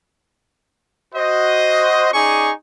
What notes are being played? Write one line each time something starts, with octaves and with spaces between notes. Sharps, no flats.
F#4 C5 D#5
C#4 D#4 G#4 D5 G#5 C#6